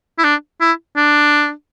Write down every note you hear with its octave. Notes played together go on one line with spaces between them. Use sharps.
E4
D4
E4
D4